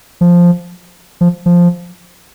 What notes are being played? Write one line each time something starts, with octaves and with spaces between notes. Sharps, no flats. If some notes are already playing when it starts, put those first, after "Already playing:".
F3
F3
F3